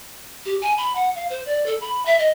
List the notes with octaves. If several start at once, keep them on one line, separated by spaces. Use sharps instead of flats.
G4
G#5
B5
F#5
F5
C5
D5
A4
B5
E5
D#5